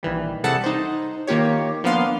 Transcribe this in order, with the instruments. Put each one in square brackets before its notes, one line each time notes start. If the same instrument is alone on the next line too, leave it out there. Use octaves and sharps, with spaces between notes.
[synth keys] A#1 D#3 E3 G3
C3 G3 G#4 A4 F#5 A5
D#4 C5
D#3 A#3 F4 G4 C#5
F3 A#3 B3 D4 F5 C6